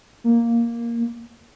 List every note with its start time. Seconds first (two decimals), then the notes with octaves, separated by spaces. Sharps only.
0.24 A#3